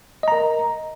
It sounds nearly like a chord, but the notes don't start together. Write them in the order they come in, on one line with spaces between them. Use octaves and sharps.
D#5 A#5 A#4